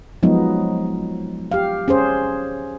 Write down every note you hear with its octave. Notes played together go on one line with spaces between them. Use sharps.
F3 F#3 G#3 B3 D#4
G4 F5
C#4 G#4 C5